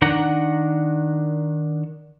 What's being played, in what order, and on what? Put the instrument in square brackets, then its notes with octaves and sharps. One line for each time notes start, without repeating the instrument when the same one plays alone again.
[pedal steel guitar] D#3 D4 F#5 A#5